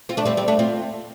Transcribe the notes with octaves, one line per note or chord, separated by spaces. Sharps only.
C4 F4
A3 D4
G3 C4
G3 C4
A3 D4
C4 F4